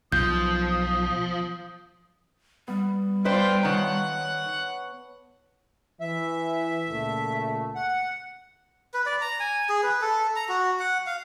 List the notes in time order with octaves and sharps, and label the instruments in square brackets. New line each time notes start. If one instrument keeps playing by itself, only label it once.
[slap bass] B1 [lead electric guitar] F3 [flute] D#6 [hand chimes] G6
[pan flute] G3 [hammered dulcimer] B3
[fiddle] F4 G5 [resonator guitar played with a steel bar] B4 C5 D5
[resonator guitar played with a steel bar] D#3 [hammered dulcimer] C#5 A5 [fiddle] F#5
[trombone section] E3 [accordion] E5
[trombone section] C#2 A#2 A3
[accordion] F#5
[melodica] B4
D5
A#5
G#5
G#4
B4
A4
A#5
F#4
F#5
F5